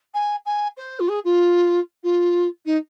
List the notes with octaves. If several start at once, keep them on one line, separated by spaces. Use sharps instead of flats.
G#5
G#5
C5
F4
G#4
F4
F4
D#4